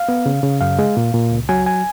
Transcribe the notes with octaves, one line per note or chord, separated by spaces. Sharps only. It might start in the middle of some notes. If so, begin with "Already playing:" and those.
Already playing: F5
B3
C#3
C#3
F#2 F5
G#3
A#2
A#2
C#2
F#3 G#5
G#5